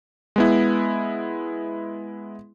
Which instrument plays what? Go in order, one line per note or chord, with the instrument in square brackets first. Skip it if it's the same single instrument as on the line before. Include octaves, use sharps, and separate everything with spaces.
[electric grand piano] G#3 B3 E4